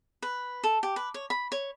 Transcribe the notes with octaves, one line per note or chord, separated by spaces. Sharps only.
B4
A4
G4
B4
C#5
B5
C#5